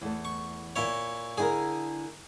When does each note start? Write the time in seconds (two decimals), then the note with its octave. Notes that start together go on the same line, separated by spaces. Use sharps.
0.01 E2 A3
0.25 C#6
0.76 A#2 E4 C#5
1.38 D3 E4 G#4 A#4